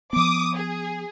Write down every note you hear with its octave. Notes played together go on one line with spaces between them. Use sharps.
F3 B3 D6 D#6
G#4